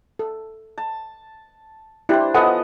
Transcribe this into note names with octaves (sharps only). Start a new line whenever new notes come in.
A4
A5
D4 E4 G4 C5
F3 B3 A4 D#5 F#5 G#5